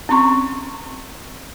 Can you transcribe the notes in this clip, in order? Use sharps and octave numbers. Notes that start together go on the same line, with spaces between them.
C4 C#4 A#5 C6 C#6